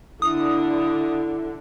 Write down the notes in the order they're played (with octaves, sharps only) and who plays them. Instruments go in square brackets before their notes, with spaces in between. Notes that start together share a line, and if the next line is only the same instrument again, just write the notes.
[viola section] D3 [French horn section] D4 E4 [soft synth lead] D#6